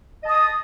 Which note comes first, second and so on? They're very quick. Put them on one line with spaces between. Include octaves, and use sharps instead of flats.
D#5 A5 D#6